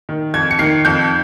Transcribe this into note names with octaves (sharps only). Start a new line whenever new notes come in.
D#3
F2 G#6
C#7
D#3 C7
F2 G6